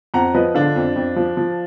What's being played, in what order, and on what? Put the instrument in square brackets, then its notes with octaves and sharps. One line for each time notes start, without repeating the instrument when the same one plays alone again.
[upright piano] F2 F#5 A#5
F3 B4 D#5
D3 D4 F4
F2
F2
F3
F3